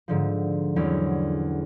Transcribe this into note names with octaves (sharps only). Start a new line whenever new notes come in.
G#2 D3 F3
E2 D3 F#3 C4 C#4